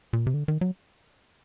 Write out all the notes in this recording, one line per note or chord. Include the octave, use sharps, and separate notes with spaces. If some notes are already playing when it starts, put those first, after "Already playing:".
A#2
C3
D3
D#3
F#3